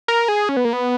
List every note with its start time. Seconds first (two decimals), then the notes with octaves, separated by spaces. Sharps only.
0.08 A#4
0.28 G#4
0.49 C#4
0.57 B3
0.65 A#3
0.73 B3